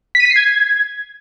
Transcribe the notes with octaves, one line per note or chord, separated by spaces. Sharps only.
B6
D#7
B6
C7
G#6